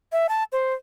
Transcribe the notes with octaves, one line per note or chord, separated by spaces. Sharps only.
E5
A5
C5